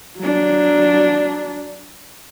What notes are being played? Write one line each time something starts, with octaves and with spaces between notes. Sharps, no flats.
F#3 D4